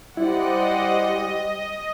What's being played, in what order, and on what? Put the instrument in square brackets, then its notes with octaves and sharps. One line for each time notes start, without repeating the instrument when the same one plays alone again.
[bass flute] G3 [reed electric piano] E4 [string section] C5 D5 F#5 [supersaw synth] D#5